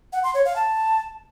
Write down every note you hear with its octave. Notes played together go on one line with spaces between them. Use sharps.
F#5
C6
C#5
F5
A5